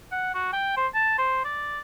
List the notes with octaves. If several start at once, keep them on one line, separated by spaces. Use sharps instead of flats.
F#5
F#4
G5
C5
A5
C5
D5